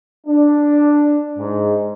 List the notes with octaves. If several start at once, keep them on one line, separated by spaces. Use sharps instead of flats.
D4
G#2